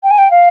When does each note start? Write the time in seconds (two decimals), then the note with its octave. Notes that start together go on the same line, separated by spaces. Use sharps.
0.03 G5
0.10 G#5
0.18 G5
0.31 F5